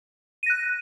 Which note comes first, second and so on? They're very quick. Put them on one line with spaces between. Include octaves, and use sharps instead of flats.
D#7 A#6 F#6